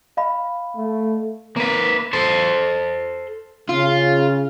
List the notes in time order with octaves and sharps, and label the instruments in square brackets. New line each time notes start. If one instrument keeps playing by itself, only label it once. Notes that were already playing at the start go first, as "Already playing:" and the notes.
[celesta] D#5 F5 B5
[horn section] A3
[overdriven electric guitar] A#3 B4
A4 C5
[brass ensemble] C#3 [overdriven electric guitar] F4